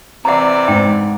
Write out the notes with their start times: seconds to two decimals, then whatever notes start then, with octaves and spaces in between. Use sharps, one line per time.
0.25 C3 E3 D5 F#5 A#5
0.68 G#2 G5